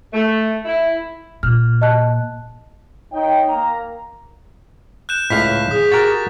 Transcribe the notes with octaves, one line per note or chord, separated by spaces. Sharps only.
A3
E4
A#2 F6
D#5 A5 F#6
D#4 C#5 G5
A#3 A#5
F#6 G6 E7
C#2 A2 F5 B6
G#4 D#6
F#4 G4 A#4 A6